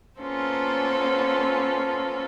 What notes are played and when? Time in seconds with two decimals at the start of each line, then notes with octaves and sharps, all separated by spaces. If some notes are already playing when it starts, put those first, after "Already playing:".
0.19 A#3 B3 C#4 F4 A4 C5